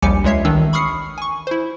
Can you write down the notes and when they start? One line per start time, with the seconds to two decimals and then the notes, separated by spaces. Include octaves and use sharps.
0.02 A#1 D#2 G3 G#5 D6 C#7
0.24 C#2 G#3 C#5 E5 C7
0.45 A1 D#3 D4 E6
0.73 B5 C#6 D#6 F6 C7 C#7
1.18 G#5 C#6
1.47 E4 C5